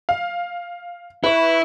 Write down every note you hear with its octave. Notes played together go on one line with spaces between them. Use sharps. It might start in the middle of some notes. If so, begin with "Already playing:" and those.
F5
E4 B4 C#6